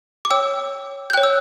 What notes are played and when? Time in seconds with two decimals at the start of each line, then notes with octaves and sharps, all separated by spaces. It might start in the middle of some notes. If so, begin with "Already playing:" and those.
0.25 D6
0.30 C#5 G5 E6
1.10 G6
1.13 C#5 G5 F#6
1.23 E6